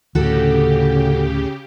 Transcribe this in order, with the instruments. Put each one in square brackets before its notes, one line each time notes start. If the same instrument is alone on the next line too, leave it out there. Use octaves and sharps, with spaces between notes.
[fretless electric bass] D2 A2 [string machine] C#3 G4 [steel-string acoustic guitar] F#4 A4